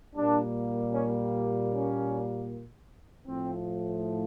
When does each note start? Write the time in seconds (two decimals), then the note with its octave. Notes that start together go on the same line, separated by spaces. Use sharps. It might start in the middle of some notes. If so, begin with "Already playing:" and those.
0.15 A#2 G3 A#3 D4
0.93 C#4
1.72 C#4
3.27 A2 F3 A3 C4